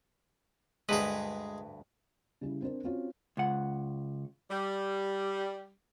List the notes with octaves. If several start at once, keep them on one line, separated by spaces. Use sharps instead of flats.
D2 G2 G#3 G#4 B4
C#3 G3 C#4 E4
C4 D4 A#4 C5
C4 C#4 F4 F#4 C#5
C#2 F#5
G3